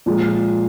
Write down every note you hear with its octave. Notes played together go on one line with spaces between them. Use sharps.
A#2 F3 G#3